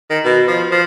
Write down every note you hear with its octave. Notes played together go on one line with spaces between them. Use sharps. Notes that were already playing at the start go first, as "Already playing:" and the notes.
D#3
B2
F3
F3